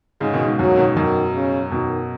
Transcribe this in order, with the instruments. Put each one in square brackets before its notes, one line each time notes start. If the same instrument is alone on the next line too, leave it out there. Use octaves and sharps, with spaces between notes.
[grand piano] G#2 C#3 [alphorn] G#3
[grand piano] B2 D#3
G#2
[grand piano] F#2 B2 [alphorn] F#3
[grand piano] B2 D#3
[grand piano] F#2 B2 [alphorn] D#3
[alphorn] C#3
[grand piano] F#2 B2 [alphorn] D#3